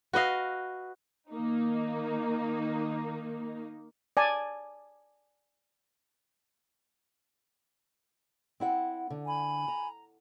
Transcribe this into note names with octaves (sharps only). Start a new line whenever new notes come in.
F#4 B4 D#5 F5
D#3 A#3 D#4
D5 G#5 A5
C4 E4 F#5
D3
G#5 B5
A#5